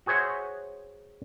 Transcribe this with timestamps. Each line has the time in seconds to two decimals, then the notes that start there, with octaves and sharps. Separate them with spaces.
0.06 F#4 G#4 C5 C#5 E5 F#5